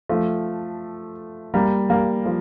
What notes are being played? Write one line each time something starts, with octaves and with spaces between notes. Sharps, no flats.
F3 A3
G3 A#3
G3 A#3
F3